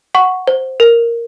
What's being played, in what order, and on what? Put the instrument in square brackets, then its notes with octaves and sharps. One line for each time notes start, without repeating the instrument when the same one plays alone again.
[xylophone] F#5 C#6
C5
A#4